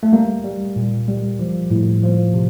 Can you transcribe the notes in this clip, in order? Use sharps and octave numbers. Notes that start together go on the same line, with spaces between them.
A3
G3 A#3
G3
A#2
G3
F3
A2
F3
C3